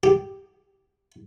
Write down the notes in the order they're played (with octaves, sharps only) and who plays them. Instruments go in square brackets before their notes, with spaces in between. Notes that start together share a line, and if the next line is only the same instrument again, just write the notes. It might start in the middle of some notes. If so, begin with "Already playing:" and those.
[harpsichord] G4